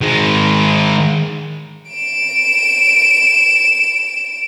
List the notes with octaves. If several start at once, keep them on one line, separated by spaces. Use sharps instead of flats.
D#3 G#3
D7 E7